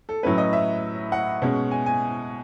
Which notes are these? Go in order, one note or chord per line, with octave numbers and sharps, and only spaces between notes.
A4
A2 F#3 C#4 E4 B4
D#5
E5
F#5
B2 G#3 C#4
G#5
G#5